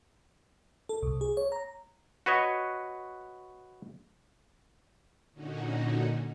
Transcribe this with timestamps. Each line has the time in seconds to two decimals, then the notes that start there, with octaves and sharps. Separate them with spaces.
0.89 A4
1.03 C2
1.21 G#4
1.37 C#5
1.52 A#5
2.26 F#4 B4 C#5 D#5
5.33 A#2 D3 C#4 D#4 F#4